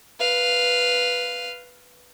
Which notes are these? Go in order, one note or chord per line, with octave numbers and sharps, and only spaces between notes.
B4 F5